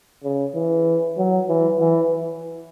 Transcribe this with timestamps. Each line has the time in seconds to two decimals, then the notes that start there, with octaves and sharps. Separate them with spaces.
0.24 C#3
0.55 E3
1.18 F#3
1.48 E3
1.79 E3